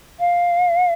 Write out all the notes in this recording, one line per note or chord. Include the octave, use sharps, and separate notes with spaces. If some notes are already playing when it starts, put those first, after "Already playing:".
F5